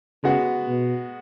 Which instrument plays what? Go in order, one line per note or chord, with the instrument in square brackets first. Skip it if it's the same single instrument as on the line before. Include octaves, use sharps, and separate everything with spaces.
[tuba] C#3 [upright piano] G#3 B3 F#4
[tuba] B2